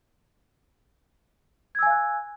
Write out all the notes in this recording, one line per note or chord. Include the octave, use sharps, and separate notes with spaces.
F5 G#5 E6 F#6 G#6